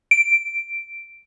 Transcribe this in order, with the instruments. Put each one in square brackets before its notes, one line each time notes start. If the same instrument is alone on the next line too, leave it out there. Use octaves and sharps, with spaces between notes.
[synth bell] D7